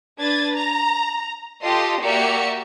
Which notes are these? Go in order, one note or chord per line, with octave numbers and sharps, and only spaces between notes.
D4 B4 G#6 A6
A#5
F4 G4 A4 D#5 C6
A#3 F#4 G4 D5 E5 C#7